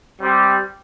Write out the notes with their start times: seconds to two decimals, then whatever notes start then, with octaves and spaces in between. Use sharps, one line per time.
0.20 G3 C4 G4